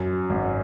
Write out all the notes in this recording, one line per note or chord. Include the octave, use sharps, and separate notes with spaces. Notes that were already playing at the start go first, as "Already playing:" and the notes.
Already playing: F#2
G#1